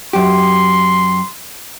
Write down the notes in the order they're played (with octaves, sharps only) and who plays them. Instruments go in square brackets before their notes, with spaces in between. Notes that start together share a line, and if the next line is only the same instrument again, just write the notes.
[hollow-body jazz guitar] F#2 G4 [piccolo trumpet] C6